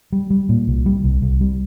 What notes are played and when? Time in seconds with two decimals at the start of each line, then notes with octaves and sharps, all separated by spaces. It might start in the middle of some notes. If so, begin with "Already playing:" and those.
0.12 G3
0.30 G3
0.49 A#2
0.67 C2
0.86 G3
1.04 C2
1.22 C2
1.41 G3